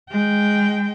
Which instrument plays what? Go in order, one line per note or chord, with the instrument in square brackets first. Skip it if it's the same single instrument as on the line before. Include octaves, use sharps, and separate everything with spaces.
[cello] G#3 G5